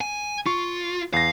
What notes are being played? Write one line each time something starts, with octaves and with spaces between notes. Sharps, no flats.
G#5
F4 C#6
E2 F5 A#6